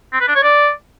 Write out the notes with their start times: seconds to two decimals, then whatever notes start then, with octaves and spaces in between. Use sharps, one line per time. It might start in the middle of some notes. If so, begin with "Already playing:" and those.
0.13 C4
0.20 B4
0.28 D4
0.35 C#5
0.43 D5